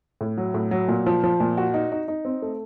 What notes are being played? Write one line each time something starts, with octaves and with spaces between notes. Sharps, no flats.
A2
F#3
A2
F#3
A#2
F3
F3
A#2
F#4
D#4
D#4
D#4
C4
A3